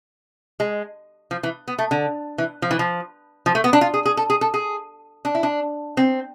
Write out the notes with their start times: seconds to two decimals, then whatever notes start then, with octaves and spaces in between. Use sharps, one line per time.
0.60 G#3
1.31 F3
1.43 E3
1.68 B3
1.79 A3
1.91 D3
2.38 E3
2.62 F3
2.71 E3
2.79 F3
3.46 F3
3.55 A3
3.64 B3
3.73 D4
3.81 F4
3.94 G#4
4.05 G#4
4.17 A4
4.30 G#4
4.41 A4
4.54 G#4
5.25 D4
5.35 E4
5.43 D4
5.97 C4